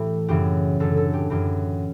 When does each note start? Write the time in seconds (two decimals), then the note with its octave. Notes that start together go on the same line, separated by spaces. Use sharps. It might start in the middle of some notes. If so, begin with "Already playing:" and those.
Already playing: A2 E3 G4
0.28 F#2 C#3 E3 G4
0.80 F#2 D3 A4
0.97 A4
1.13 G4
1.30 F#2 E3 G4